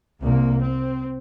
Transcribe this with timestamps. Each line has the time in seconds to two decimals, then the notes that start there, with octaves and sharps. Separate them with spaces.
0.22 C2 C3 A#3
0.62 C4